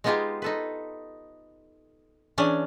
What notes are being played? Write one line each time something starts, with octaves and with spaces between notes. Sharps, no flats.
G#3 B3 D#4 F4 G4 G#4
D#4 A4 B4
E3 C#4 D4 G#4